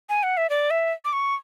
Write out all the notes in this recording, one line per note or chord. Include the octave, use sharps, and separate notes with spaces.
G#5
F#5
E5
D5
E5
D6
C#6